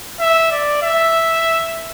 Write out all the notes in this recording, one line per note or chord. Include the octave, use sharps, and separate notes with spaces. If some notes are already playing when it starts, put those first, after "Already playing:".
E5
D5
E5